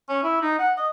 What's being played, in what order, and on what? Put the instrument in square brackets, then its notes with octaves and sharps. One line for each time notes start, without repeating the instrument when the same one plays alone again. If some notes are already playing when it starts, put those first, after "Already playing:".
[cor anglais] C#4
E4
D#4
F#5
D#5